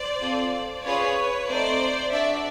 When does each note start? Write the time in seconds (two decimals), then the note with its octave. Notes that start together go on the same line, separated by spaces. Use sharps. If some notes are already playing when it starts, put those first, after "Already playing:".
Already playing: C5 D5
0.21 C4 F4 A4
0.84 C#4 F4 G#4 B4 C#5
1.48 A3 C4 D#4 C5 D5
2.10 D4 F#4 A4 D5 E5